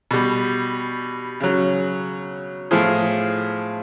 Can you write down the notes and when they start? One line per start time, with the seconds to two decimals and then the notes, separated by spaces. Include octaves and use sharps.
0.11 B2 G3
1.40 C#3 F#3
2.71 A2 F3 G#4